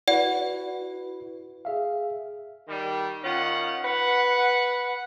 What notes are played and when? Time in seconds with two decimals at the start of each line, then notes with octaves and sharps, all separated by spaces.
0.08 E4 F#4 B4 D5 F#5
1.65 G#4 E5 F5
2.68 D#3 G3
3.24 D#3 C#4 F4 F#5
3.84 B4 F#5